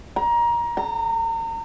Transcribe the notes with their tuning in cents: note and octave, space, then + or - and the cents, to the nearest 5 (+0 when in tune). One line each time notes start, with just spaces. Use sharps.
A#5 +20
A#5 -35